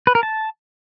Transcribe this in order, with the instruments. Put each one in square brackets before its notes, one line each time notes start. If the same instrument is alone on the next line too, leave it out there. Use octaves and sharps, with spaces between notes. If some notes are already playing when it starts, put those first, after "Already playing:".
[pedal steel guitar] B4
A#4
A5